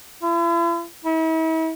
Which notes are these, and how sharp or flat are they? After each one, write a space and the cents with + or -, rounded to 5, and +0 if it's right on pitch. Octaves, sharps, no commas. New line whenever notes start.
E4 +45
E4 -40